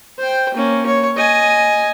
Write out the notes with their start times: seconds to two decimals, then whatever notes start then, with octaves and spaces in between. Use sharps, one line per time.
0.18 C5 G5
0.54 A#3 C#4
0.86 C#5
1.17 D#5 G#5